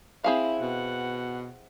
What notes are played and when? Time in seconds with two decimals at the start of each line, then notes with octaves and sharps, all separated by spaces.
0.24 C4 E4 G#4 F5
0.61 B2 F#5